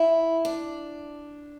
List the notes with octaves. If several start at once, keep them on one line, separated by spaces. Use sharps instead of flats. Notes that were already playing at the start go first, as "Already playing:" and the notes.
Already playing: E4
D4